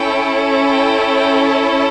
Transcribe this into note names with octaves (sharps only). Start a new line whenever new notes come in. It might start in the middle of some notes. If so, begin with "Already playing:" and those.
Already playing: C#4 E4 A4 G5
G5
G5
A5